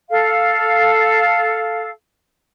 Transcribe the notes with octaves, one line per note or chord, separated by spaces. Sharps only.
A4 F5